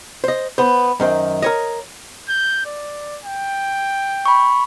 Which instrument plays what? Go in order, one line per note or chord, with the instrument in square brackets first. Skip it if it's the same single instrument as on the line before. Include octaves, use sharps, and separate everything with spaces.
[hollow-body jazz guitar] C5 D#5
B3 C5
F#2 D#3 C5
A#4 C#5 D#5
[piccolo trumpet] G6
D5
G5
[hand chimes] B5 C#6